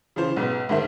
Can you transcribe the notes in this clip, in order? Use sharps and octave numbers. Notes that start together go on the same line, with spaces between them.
C#3 E3 F4 C5
B1 G#2 B3
D2 G#2 D#3 A#4 C5 E5